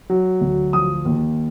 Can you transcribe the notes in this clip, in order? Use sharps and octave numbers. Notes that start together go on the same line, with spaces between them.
F#3
D2
F3 D#6
D#2